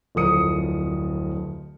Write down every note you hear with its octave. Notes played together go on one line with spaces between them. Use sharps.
D1 F2 A#4 D#6 C#7